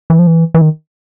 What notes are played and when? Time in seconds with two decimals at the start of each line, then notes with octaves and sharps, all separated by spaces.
0.10 E3
0.19 F3
0.27 E3
0.54 E3
0.61 D#3